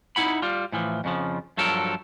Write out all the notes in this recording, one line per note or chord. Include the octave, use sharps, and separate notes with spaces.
D#4 E4 F#5 B5
G3 F4
A2 E3 F3
F2 C#3 F3
G2 F3 F#3 A4 A#4